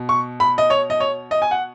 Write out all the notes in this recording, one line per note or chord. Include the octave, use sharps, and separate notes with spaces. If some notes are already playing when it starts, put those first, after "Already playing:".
Already playing: B2
C#6
B5
D#5
C#5
D#5
C#5
D#5
G#5
F#5